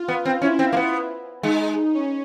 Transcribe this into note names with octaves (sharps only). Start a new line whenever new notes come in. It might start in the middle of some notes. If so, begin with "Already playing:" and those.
Already playing: F4
B3
C4
C#4 E4
C4
A#3
B3
G#3 D#4
C#4